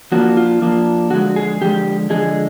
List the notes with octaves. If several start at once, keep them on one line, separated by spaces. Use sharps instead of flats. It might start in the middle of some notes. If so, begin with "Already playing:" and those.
F3 A#3 D4 F4 F#4
F4
F3 A#3 D4 F4
D3 F3 G#3 F#4
G#4
D3 F3 G#3 G4
D3 F3 G#3 G#4